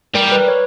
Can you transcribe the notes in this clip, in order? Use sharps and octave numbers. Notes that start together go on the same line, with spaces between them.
G3 A#4
B4
C#5